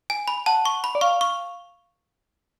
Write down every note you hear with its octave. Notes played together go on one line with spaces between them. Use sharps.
G#5
B5
F#5 A5
C#6
B5
D5
F5 C#6
C#6